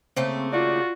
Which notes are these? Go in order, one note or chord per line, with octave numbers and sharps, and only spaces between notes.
C#3 A3 A#3 C4
F4 F#4 D5